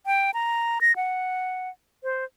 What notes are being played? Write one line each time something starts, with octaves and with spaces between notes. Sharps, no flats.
G5
A#5
A#6
F#5
C5